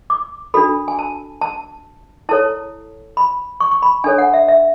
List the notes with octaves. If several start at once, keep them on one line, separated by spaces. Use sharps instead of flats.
D6
D4 F#4 A4 B5
G#5
A5
A5
E4 A4 C#5 A5
B5
C#6
C#6
B5
D4 A4 C#5 G#5
F#5
E5
E5